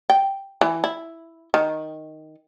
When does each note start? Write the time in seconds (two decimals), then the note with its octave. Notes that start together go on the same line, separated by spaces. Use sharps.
0.10 G5
0.61 E3
0.84 E4
1.54 D#3